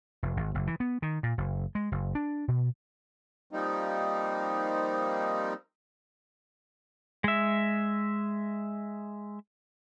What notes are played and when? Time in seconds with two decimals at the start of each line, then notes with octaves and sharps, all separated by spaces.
0.23 F1
0.37 G#1
0.55 F#1
0.67 E3
0.80 B3
1.02 D#3
1.23 A#2
1.38 F#1
1.75 G#3
1.92 F#1
2.15 D4
2.48 B2
3.51 F3 G3 A#3 C4 D#4
7.24 G#3 E5